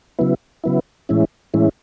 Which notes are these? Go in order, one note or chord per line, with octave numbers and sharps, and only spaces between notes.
C#3 F#3 B3 E4
C#3 F#3 B3 E4
A2 E3 G#3 C#4 E4
A2 E3 G#3 C#4 E4